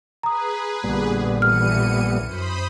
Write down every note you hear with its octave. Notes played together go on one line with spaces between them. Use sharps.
G#4 B4 A#5 D#6
A#1 A#2 D3 G3 B3
E3 F6 C#7 D#7
F#2 C5 B5 D#6